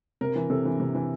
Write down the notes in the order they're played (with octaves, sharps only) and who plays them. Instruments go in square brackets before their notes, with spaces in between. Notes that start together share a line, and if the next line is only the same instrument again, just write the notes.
[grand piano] C3 A#4
E3
C3 A4
E3
C3
E3